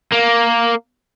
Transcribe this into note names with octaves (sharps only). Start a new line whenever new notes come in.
A#3